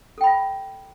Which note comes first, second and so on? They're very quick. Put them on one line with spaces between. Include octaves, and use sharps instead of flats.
A4 G5 B5 E5